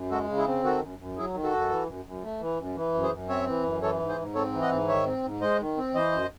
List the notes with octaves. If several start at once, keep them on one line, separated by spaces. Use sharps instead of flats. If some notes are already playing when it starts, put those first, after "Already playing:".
Already playing: F#2
G#3 F#4 A4
C#3
E4 G#4
C4
D#3 F#4 A4
F#2
F#2
F#3 E4 G#4
D#3
F#4 A4
F#2
E3
F#2
F#2
A3
E3
F#2
E3
F#2
G#4 C5
F#2
C4 C#5 E5
E3
F#2
E3 A4 C#5
G#2
G#4 C5
G#2
C4 A4 C#5
E3
D#5 F#5
G#2
D#3 C#5 E5
C4
G#2
G#3 C5 D#5
D#3
C4
E3 C5 D#5
F#2